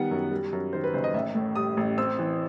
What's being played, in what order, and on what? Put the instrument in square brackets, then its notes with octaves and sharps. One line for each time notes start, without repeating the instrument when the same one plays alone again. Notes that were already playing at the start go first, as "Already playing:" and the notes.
Already playing: [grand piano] D#3 G3 B3 F#5
F#2
G3
F#2
D#3 C5
B4
F#1 C5
D#5
A1 E5
A2
G3 D#6
A1
C4 E6
E3